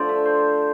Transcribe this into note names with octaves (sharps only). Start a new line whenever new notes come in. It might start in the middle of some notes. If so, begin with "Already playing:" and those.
Already playing: D3 F3 A3 C5 D5
E5
C5